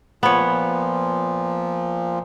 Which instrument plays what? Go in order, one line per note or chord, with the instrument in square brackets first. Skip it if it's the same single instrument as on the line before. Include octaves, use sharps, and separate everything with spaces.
[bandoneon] A#2 F3 [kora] B3 C#5